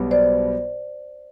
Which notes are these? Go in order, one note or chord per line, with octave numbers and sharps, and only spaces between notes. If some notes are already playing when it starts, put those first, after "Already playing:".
Already playing: B1 B2 G3 B3
C5 D5